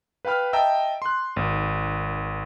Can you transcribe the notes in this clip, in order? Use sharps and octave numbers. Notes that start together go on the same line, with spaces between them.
B4 F5 G5 B5 F6
D#5 E5 G5 A5 A#5 E6
C6 F#6
G#1